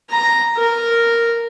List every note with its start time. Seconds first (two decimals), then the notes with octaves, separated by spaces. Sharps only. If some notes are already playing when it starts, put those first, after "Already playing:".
0.10 A#5
0.57 A#4